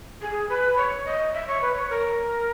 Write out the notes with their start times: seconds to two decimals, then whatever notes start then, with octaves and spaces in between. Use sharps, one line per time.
0.22 G#4
0.49 B4
0.77 C#5
1.05 D#5
1.33 E5
1.47 C#5
1.61 B4
1.75 C#5
1.90 A#4